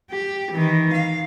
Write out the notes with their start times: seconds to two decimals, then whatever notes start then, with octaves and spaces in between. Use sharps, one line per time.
0.11 G4
0.52 D#3 E3
0.93 F5